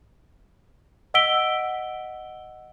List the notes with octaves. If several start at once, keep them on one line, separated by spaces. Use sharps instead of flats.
D#5 F#5 E6 B6 D7 G7